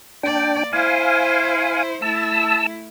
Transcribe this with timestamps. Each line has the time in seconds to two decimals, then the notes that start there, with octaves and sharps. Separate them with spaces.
0.23 A#3 D4 D5 G5
0.73 E4 C5 F5 G#5
2.02 A3 E4 A5 E6